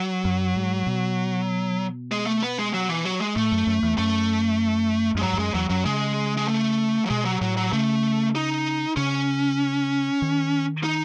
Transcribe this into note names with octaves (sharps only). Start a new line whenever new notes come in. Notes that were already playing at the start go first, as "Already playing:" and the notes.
Already playing: F#3
F#2
G#2
B2
G#3
A3
B3
G#3
F#3
E3
F#3
G#3
A2 A3
F#2
F#2
E2
F#2 A3
F#2 G#3
G#2 F#3
E2
F#2 G#3
E2 F#3
F#2 F#3
C#3 G#3
G#3
A3
F#3
B2 G#3
F#3
A2 F#3
F#3
C#3 A3
D#4
C#3 C#4
D#3
D#4